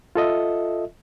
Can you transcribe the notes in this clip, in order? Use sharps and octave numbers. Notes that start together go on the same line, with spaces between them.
F4 A4 D#5 E5